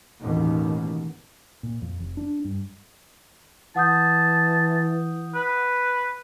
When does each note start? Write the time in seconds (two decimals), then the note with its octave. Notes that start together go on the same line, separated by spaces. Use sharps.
0.22 A1 D#2 B2
1.63 A#2
1.82 F2
2.00 F1
2.17 D4
2.45 G2
3.76 E3 F#5 A5 D#6 G6
5.35 B4